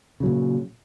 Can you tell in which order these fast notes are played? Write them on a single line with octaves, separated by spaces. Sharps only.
C#3 F#3 A#2